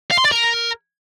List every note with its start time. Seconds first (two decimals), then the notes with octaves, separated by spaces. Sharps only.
0.11 F5
0.18 C6
0.25 D5
0.32 A#4